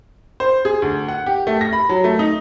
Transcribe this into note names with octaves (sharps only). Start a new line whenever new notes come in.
C5
G#4
D2
F#5
G4
A3
A#6
B5
F#3
A3
D#4